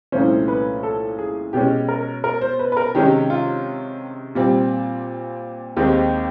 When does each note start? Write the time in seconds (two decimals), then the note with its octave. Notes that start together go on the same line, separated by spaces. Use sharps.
0.12 C2 A#2 F3 A3 C#4 C5
0.48 B4
0.83 A4
1.19 G#4
1.53 B2 G#3 C#4 G4
1.88 A#4
2.24 A#4
2.41 C5
2.59 B4
2.72 B4
2.77 A#4
2.94 C3 D#3 G#3 C#4 G4
3.30 F4
4.35 A#2 G3 C4
5.77 D#2 D#3 G#3 C4 G4